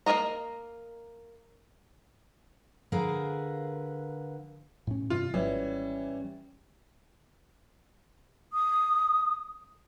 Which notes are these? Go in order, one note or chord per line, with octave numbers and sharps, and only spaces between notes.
A#3 G#4 A#4 D#5 A#5
D3 G#4 A#4 B4 F5
A2 C#4
G2 C3 E3 F4
G#1 E3 G3 C#4
D#6